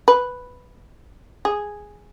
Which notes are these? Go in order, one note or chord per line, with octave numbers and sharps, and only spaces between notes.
B4
G#4